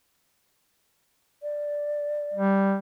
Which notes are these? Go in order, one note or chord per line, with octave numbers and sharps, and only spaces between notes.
D5
G3